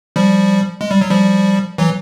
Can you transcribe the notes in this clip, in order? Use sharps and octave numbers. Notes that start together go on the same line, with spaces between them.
F3 G3
G#3
G3
F#3
F3 G3
E3 F#3